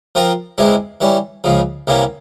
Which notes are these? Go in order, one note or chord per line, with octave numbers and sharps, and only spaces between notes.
F3 C4 F4 A#4
E2 C3 E3 G#3 E4
E3 G3 C#4
C#2 C#3 F3
C2 C3 E3 A#3 C#4